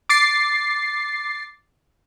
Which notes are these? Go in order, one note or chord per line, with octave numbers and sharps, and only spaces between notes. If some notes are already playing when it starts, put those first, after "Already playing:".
D6 A6 C7